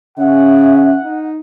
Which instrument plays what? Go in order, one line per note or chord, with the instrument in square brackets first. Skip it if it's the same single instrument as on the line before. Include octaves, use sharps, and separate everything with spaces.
[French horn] C#3 [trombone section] C#4 [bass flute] E5 [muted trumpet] F#5
[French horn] D#4